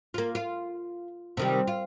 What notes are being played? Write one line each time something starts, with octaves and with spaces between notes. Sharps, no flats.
A#3 F4
F4
C3 D#3 G3
F4